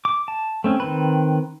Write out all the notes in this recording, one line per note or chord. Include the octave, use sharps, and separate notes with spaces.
D6
A5
A3 C4 C#4
D#3 C4 B4